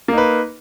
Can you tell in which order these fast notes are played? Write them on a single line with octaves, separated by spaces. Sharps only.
A#3 D#4 B4